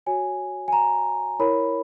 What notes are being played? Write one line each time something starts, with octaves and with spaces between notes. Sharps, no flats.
F#4 C#5 G#5
G#5
A#5
E4 A#4 C#5 B5